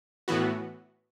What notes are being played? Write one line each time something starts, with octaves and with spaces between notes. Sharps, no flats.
A2 E3 B3 F#4